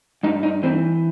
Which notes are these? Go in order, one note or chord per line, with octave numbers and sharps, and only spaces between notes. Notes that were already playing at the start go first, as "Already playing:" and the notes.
G2 D#4
D#4
E3 C4